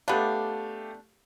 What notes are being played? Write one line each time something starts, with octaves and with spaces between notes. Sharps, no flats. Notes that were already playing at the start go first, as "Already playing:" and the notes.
A3 B3 D4 G4 F5